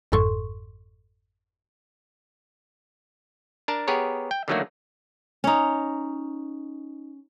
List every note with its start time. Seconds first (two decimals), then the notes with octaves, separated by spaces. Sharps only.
0.12 G1 F2 G#2 A4 C6 C#6
3.68 D4 A#4 A5
3.88 B3 G4 G#4 A#4 C#5
4.31 G5
4.48 D3 D#3 F#3 A3 A#3 F#4
5.44 C#4 D#4